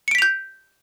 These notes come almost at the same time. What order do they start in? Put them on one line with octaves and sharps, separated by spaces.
C#7 D7 B6 F7 G6